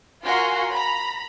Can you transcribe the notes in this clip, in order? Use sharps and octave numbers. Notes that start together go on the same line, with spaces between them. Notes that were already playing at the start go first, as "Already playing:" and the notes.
F4 F#4 A#4 G#5 A#5 C6
A#5 B5